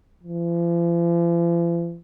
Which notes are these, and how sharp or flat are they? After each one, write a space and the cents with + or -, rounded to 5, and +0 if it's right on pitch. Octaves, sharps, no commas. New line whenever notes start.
F3 -45